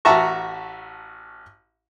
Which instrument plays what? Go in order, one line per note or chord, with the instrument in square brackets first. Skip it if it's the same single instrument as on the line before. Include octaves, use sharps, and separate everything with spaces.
[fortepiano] A1 F#4 E5 A5 A#5 C#6